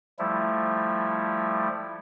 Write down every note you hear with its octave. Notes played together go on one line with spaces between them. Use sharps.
F3 G3 A3 E4